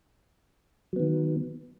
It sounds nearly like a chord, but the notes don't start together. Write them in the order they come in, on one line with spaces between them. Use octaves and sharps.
F#3 B3 D#3